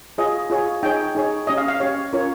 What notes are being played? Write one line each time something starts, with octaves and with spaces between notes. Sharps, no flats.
F4 G#4 C#5 D#5
F4 G#4 C#5
D#4 G#4 C#5 G5
D#4 G#4 C#5
C#4 G4 C#5 D#5
F5
F5
C#4 G4 C#5
C#4 F4 A#4 C#5